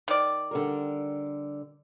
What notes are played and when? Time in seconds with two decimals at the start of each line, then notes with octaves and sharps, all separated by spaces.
0.08 D#3 D5
0.51 D3 G3 A#4